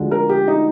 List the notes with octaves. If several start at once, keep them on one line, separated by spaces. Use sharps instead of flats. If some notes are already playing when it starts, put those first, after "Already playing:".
Already playing: D2 D3 F3 G#3
A#4
G4
D#4